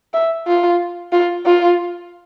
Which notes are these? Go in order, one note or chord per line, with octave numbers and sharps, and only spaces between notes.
E5
F4
F4
F4